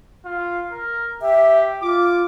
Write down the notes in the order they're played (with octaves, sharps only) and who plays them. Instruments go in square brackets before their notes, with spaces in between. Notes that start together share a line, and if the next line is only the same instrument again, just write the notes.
[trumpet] F4
A#4
[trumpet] G4 [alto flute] E5
[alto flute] F4 [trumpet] D6